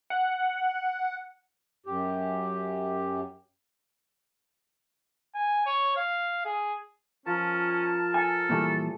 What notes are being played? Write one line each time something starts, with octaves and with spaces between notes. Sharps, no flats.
F#5
F#2 G4
G#5
C#5
F5
G#4
F3 C#4 A#4 A5
A4 G#5
A#2 E3 G3 A3 G#4